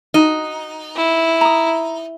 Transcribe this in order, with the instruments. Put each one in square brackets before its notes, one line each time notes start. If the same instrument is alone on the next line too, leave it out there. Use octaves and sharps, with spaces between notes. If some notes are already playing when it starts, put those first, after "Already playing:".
[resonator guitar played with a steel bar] D#4 [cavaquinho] F#4
[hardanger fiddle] E4
[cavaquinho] A#5 D#6